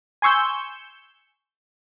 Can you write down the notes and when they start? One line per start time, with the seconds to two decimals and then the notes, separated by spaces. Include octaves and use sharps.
0.22 G#5 C6 C#6 E6 G6